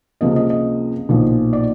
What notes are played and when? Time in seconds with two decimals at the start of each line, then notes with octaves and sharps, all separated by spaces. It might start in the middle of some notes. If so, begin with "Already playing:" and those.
0.21 C#2 C3 F3 A#3 D#5
0.36 D#5
0.50 D#5
1.09 B1 A#2 F3
1.53 D5